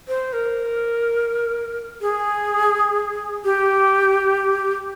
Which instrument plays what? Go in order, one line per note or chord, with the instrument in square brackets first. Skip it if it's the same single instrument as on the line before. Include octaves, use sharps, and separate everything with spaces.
[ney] C5
A#4
G#4
G4